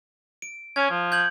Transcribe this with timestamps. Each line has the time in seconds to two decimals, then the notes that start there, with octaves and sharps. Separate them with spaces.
0.42 D7
0.76 C#4 G#6
0.91 F3
1.12 G6 G#6 F#7